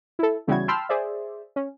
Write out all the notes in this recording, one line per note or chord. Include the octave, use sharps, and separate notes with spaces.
E4 A4
E2 C#3 G3 E4 F#4 G#6
G5 A5 B5 C6 E6 F6
G#4 C5 D5 E5
C#4